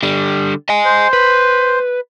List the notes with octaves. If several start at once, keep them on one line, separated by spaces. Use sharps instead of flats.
D3 G3
D#5 G#5
C5
B4